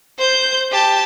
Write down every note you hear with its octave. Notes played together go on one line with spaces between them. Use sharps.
C5 G6
G4 A5